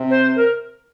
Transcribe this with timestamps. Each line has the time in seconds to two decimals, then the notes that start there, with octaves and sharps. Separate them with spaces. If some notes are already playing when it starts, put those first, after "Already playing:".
Already playing: C3
0.10 C5
0.36 A#4